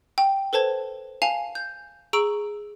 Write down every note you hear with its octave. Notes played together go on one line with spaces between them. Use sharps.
G5
A4 B4 C5 A5 G#6
F5 G#5 A5 C7 F7
G6
G#4 A#5 C#6 E6 D7 F#7